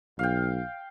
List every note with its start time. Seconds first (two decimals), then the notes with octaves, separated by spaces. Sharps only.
0.19 B1 F5 G5